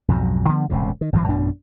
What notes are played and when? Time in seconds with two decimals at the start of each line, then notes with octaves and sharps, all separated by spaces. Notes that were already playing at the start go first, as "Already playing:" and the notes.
0.08 B1 F2 G#2 F#3
0.49 D3 F3 B3
0.70 E1 C#2 A2 C3
1.01 D#3
1.13 G#1 F#2 C3 E3
1.28 A1 F#2 B2 D4